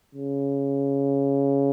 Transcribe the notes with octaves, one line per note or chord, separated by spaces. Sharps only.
C#3